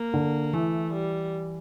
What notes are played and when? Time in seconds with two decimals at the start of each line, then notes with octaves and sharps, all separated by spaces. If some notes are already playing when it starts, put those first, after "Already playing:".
Already playing: A#3
0.14 D3
0.53 E3 A3
0.93 G3